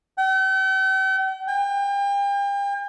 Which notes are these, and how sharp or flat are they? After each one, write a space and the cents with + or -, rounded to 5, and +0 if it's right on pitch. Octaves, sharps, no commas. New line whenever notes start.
G5 -45
G5 +40